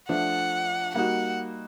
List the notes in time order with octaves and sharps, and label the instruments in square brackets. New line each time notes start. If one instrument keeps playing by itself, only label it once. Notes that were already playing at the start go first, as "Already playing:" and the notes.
[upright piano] F3 A3 D4 [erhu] F#5
[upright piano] G3 A#3 D#4 F#4 [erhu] F#5